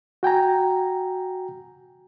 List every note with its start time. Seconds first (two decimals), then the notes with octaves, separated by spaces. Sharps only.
0.23 F#4 G5 G#5 A#5